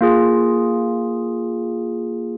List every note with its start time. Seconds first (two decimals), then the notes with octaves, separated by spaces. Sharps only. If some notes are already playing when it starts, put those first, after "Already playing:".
0.01 A#3 F4 G#4